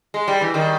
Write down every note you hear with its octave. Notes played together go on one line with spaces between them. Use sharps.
G#3
G3
E3
D#3 G3